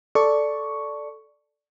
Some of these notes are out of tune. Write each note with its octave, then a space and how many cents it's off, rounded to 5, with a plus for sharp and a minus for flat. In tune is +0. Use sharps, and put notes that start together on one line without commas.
A4 +0 D5 +0 C#6 +5